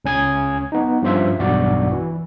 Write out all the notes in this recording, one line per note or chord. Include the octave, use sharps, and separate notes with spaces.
C#2 C#4 G#5 D#6 G#6
B3 D#4
G2 F3 C#4 F4 C5 E5
B1 E2 G2 F#4 D5
E3